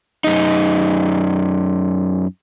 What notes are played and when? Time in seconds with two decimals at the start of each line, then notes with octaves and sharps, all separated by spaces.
0.24 F#2 D#4